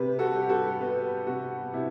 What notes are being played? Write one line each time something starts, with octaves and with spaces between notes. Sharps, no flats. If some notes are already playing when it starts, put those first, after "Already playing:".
Already playing: C3 G4 B4
F#4 A4
G3
G4
F#4 A4
B3 F#4
C3 F#4
C3 E4 G4